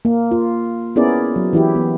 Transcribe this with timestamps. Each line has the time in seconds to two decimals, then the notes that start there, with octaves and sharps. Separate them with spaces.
0.05 A#3
0.31 F4
0.96 B3 C#4 E4 G#4 A#4 D5
1.36 F#3
1.53 E3 E4 G4
1.75 B3